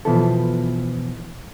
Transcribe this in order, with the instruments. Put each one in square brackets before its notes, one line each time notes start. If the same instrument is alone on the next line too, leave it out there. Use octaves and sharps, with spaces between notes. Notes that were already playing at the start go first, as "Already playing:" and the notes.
[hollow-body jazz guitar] B2 E3 F3 B3 E4 A4